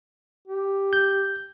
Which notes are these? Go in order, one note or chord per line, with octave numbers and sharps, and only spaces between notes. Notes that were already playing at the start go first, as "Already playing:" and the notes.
G4
G6